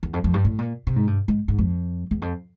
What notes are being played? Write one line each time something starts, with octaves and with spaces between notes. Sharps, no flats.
E2
F2
F2
G2
A2
A#2
C3
G#2
G2
G#2
G#2
F2
E2
F2